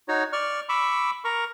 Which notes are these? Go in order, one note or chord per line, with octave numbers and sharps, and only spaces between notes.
D#4 F#4 C#5
D5 C#6 F6
B5 C#6 D6 E6
A#4 A#5 C#6